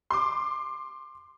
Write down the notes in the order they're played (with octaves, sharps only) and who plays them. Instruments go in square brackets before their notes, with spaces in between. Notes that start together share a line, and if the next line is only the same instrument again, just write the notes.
[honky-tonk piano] C6 D6